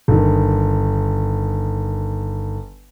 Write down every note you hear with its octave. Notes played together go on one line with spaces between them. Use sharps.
G1 D#3